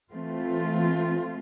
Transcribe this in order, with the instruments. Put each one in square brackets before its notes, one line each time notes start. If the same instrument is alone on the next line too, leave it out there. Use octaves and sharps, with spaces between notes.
[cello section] E3 A3 C4 F4